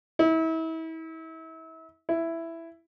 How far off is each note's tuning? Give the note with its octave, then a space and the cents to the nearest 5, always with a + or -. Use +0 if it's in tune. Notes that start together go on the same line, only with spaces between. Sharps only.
E4 -35
E4 +5